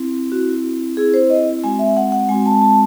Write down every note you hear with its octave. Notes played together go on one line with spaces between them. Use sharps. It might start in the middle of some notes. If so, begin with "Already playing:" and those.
Already playing: C4 E4
C4 E4 F#4
C4 E4 G#4
C5
D#5
G#3 C4 F#4 G#5
E5
F#5
F#5
G#3 C4 F#4 G#5
A5
A5